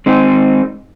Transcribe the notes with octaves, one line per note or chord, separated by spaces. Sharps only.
G#3 C4 D#4